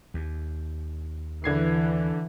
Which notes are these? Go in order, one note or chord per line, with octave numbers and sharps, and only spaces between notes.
D#2
D3 E3 G#6 C7